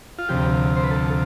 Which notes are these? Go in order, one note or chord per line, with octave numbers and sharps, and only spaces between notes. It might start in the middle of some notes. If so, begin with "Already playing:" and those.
F4
D2 C3 F3 G4
C5
B4
A4